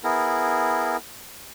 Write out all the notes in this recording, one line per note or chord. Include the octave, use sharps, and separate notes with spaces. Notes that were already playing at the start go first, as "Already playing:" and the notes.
B3 E4 G#4 A#4